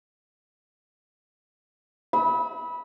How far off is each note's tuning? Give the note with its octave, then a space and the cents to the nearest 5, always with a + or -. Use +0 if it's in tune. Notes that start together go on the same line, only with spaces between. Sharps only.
B5 -15 E6 -40